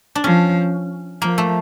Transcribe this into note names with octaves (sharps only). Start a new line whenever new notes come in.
D4
F3 C#4
F3 A#3
A3